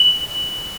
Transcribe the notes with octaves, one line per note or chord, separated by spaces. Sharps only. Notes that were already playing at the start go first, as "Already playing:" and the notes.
Already playing: F#7